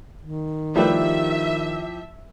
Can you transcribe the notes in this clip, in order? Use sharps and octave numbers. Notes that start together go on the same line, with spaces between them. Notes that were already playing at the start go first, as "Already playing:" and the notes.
D#3
F3 G3 A3 E4 G4 B4 E5